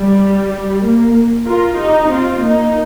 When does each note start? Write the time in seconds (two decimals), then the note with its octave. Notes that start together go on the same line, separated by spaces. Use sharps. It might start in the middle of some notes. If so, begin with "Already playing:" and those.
Already playing: G3
0.84 A#3
1.46 F4 A#4
1.77 D#4 G4
2.09 C4 F4
2.41 A#3 D#4